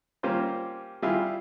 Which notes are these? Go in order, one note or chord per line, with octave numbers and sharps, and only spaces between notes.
G3 A#3 C#4 F4 G4 C5
G3 E4 F4 G#4